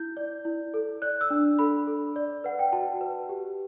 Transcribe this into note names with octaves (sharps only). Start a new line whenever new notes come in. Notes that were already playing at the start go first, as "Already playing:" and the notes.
Already playing: E4 G6
D5
E4
A4
D5 F#6
E6
D4
A4 B5
A4
D5
B4 F#5
G5
F#4 A5
B4
G4